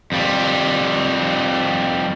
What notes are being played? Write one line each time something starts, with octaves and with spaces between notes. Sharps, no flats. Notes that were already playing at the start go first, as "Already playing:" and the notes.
F2 G3